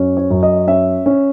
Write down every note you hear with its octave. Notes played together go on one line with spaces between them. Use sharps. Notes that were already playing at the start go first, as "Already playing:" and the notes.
Already playing: F#2 C#4
C#5
F#2
D#5
C#4 E5
C#4